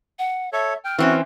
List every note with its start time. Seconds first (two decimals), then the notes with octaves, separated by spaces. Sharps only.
0.19 F#5
0.53 A4 C#5 E5
0.84 G5 F6
0.99 E3 C4 C#4 F#4